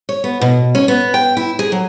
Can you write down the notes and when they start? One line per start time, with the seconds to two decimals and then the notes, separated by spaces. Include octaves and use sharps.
0.09 C#5
0.24 B3
0.41 B2
0.75 C#4
0.88 B3
1.14 G5
1.37 E4
1.59 G#4
1.72 F#3